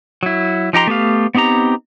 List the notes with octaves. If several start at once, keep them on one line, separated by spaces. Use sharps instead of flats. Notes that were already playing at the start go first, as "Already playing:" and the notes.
F#3 E4
F3 D#4 G4 A#5 C6
A3 B3 G4 F5
B3 C4 D#4 G4 A#5